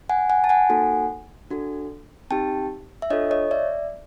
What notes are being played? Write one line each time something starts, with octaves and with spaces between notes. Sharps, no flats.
F#5 G#5
F#5 G#5
A5
F#5 G#5
A#3 D#4 F#4 A4
D4 F#4 A4
C4 D#4 G4 G5 A5
E5
D4 F4 A4 C#5 D#5
C#5 D#5
D5 E5